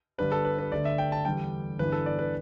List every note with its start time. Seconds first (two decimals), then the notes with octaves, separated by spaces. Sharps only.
0.18 G1 G2 G3 D4 B4
0.32 A4
0.45 B4
0.59 B4
0.72 D2 D3 A3 D5
0.85 E5
0.98 G5
1.12 A5
1.25 E2 D3 G3 D4 G5
1.79 G1 G2 E3 B3 D4 B4
1.92 A4
2.06 D5
2.19 B4